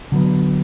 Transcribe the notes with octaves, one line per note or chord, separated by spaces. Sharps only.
D3 F#3 B3